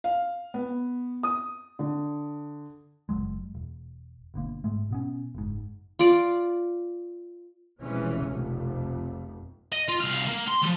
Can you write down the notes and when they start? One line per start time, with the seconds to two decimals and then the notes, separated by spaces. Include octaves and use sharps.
0.04 F5
0.54 B3
1.23 D#6
1.79 D3
3.09 F#1 F#2 F#3 G#3
3.55 E1
4.34 G1 B2 D3 A#3
4.64 G#2 G#3 A3
4.90 B2 B3 C#4
5.35 F#1 G#2
5.99 F4 D5
7.81 F1 B2 E3 G#3 C#4
8.24 F1 B1 F2
9.72 D#5
9.88 F4
10.00 C2 F5
10.27 A#3
10.48 C6
10.62 E3 F3